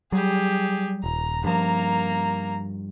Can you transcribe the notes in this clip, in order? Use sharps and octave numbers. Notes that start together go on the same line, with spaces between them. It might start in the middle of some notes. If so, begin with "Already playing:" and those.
F#3 G3 G4 G#4
D#1 A#5
G2 F3 A#3 A#5